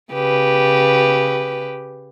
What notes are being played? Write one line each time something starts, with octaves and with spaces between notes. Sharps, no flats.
C#3 G4 B4